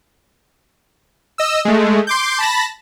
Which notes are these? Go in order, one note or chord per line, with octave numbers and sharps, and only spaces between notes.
D#5 E6
G#3 A3
C6 D6 G6
A5 B5 A#6